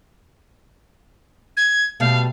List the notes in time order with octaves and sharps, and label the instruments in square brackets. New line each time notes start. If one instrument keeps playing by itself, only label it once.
[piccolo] G#6
[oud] B2 G3 A3 [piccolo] F5